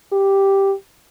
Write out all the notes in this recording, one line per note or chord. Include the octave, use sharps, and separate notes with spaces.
G4